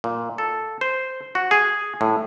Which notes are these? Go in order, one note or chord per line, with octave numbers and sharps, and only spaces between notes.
A#2
A4
C5
F#4
G#4
A2